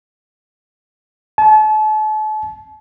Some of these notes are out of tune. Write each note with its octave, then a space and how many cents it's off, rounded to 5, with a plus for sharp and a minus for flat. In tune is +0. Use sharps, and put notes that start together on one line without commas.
A5 -40